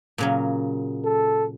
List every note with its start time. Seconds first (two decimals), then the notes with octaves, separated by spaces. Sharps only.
0.18 A#2 C#3 F#3
1.05 A4